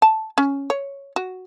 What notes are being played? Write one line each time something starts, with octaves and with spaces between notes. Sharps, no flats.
A5
C#4
C#5
F#4